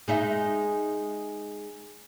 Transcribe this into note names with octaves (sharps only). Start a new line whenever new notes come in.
G#3 D#4 E5